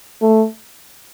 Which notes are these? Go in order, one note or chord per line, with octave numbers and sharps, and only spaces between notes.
A3